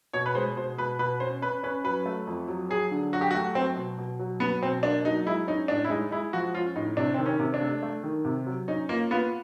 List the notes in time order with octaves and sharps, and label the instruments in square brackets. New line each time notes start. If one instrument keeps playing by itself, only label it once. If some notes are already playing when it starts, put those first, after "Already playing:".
[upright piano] B2 [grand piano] C#5
[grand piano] B4
[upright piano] G#3 [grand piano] C5
[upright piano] B2 [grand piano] C5
[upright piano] B2 [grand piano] B4
[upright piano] B2 [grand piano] B4
[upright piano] C#4 [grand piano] C5
[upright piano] C#4 [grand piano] B4
[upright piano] C#4 [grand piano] B4
[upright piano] F#3 [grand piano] B4
[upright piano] A3
F2
F#3
[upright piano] F#3 [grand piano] G#4
[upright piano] D3
[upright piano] F#3 [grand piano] F#4
[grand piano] G4
F#4
[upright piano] A3
[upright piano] F#3 [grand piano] C4
[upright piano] B2
B2
F#3
[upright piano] F#3 [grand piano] B3
[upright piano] B2 [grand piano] C4
[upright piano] A#3 [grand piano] D4
[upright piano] F#3 [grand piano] D#4
[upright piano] G#3 [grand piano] E4
[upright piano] C#4 [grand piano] D#4
[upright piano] A2 [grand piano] D4
[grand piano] E4
[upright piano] G#3 [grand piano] D#4
[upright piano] G#3 [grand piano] E4
[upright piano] F3 [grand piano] F#4
[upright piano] C#4 [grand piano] F4
[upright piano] A2 [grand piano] D#4
[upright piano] C3 [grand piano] D4
[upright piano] D#3 [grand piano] C4
[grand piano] C#4
[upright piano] C3
[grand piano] D4
[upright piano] A3
A3
D#3
C3
F#3
[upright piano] C#4 [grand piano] D#4
[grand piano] A#3 [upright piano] F4
[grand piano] B3 [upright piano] F4